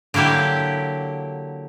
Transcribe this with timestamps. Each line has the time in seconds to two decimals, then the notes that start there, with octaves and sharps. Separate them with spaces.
0.14 D3 F#3 A#3 E4 G4